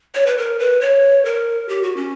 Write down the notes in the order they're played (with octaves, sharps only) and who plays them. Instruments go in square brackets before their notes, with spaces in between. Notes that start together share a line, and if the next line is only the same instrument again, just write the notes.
[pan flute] C#5
B4
A#4
B4
C#5
A#4
G4
F#4
C#4